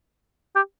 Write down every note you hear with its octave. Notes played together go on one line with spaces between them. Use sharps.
G4